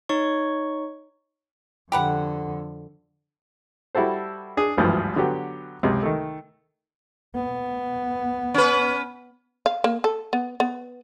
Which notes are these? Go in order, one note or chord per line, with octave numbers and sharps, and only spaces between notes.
D#4 C#5 C#6
F2 D3 G4 B4 F#5
G3 E4 F#4 A4 C5
D4 G#4
G#1 D2 G2 E3 F3
D3 F#3 B3 G4
C#2 C3
D#3 A3
B3
C#4 B4
F5
A#3
A4
B3
B3